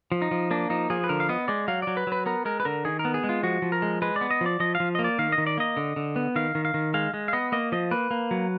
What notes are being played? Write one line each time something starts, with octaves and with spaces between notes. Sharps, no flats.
F3
D#4
F3
A#3 D4
F3 D#4
F3 G#4
B4
D3 A#4
F5
B3 D#5
G#3 D5
F#3 F5
F#3 D5
B4
F#3 B4
B3 A#4
G#3 A#4
B4
D3 A#4
D#3 G#4
A#4
B3
G#4
G#3
F4
F3 F#4
F3
A#4
G#3
G#3 B4
D5
B3
D#5
F3 D5
F3 D#5
F5
F3
A#3 D#5
D5
D#3 F5
D#5
D#3
D5
A#3 D#5
D3
D3
B3
D#3 F5
D#3
F5
D#3
G#3 F5
G#3
F5
B3 D#5
A#3 D#5
F3 D#5
A#3 B4
A#3
F#3